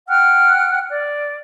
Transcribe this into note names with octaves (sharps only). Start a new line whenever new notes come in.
F#5 G5 F6 F#6
D5